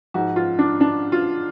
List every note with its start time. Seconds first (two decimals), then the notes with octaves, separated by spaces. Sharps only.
0.14 G#2 F3 F#4
0.36 F4
0.59 D4
0.81 D4
1.12 F4